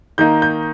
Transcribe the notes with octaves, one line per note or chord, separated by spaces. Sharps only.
D#3 A#3 D#4 G6
G6